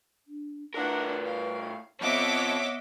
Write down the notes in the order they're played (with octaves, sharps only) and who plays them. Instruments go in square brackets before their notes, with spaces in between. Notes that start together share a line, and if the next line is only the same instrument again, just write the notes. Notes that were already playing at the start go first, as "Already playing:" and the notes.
[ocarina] D4
[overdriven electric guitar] A2 A#4 [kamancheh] D4 F#5 [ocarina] B4
[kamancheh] F5
[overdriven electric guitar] F3 C4 [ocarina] B3 [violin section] C#5 E5 D6 [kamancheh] D#5 F#5